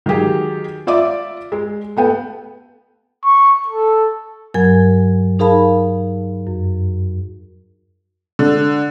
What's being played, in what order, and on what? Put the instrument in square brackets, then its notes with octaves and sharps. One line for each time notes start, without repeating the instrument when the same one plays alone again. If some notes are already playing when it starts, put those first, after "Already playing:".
[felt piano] D#3 F#3 G4 G#4
F4 D5 E5 D6
G#3
A3 B3 G5
[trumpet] C#6
A4
[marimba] G2 F#3 A#4 G#5 G#6
D#4 G#4 A#4 F5 A5 B5
F#2
[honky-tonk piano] D3